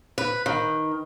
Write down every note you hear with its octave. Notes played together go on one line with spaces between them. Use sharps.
B4
D#3